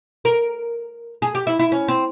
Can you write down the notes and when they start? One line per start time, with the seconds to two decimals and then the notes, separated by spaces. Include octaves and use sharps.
0.25 A#4
1.22 G#4
1.35 G4
1.47 E4
1.59 E4
1.72 C#4
1.88 C4